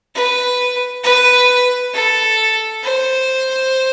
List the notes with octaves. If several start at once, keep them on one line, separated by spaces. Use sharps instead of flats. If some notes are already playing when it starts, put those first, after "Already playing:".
B4
B4
A4
C5